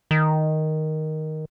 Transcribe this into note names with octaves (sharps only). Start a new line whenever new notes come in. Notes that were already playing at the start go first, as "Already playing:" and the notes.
D#3